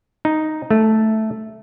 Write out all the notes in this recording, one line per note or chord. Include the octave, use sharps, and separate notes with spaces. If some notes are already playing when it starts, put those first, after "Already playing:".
D#4
A3